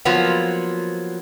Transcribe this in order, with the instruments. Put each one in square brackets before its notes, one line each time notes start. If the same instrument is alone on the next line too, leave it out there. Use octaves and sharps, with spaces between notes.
[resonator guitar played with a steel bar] F3 F#3 A#3 B3